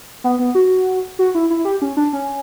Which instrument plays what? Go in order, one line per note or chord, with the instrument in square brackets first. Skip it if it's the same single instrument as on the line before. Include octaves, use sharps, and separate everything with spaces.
[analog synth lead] B3
B3
F#4
F#4
E4
E4
G4
C#4
D4
C#4